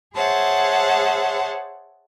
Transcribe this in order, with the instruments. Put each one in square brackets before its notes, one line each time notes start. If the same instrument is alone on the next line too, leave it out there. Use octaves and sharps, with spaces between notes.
[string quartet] G#4 C5 C#5 E5 F#5 A5